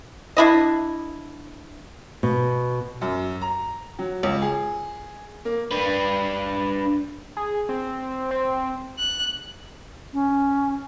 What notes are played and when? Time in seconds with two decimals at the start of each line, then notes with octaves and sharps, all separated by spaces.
0.37 D4 E4 D#5
2.23 B2
3.01 F#2
3.42 A#5
3.99 F#3
4.23 C#2
4.42 G#4
5.45 A#3
5.71 D4 B4
7.37 G#4
7.69 C4
8.31 C4
8.99 F#6
10.13 C#4